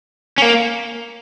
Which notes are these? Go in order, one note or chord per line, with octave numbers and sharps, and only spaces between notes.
C#4
A#3